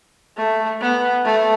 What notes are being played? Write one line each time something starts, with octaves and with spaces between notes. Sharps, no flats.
A3
B3
A3